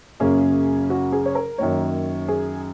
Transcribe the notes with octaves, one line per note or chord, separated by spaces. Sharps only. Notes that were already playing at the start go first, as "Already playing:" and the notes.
F#2 C#3 A#3 C#4 G#4
F#4
G#4
C#5
A#4
F#2 D#3 A#3 C#5
G#4